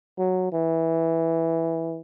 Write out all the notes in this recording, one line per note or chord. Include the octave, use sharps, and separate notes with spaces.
F#3
E3